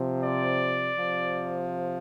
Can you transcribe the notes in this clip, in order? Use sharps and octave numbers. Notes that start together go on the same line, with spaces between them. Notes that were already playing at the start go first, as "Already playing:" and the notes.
Already playing: C3 F3
D5
F3
C3